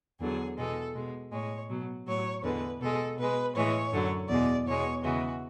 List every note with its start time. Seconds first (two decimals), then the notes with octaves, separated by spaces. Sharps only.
0.20 E2 D3 F#3 G#4
0.57 E2 B2 G#3 A4
0.95 B2 G#3
1.31 A2 G#3 C#5
1.69 B2 F#3
2.06 A2 F#3 C#5
2.43 E2 D3 G#3 B4
2.80 B2 G#3 A4
3.17 B2 G#3 B4
3.55 A2 E3 G#3 C#5
3.92 F#2 D3 F#3
4.29 E2 B2 G#3 D5
4.66 E2 B2 G#3 C#5
5.03 E2 C#3 E3 G#3 F#4